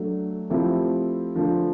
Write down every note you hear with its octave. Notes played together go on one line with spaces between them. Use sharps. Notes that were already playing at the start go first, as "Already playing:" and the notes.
Already playing: F#3 A3 D4
F3 A3 C4 E4 G4
D3 F3 A3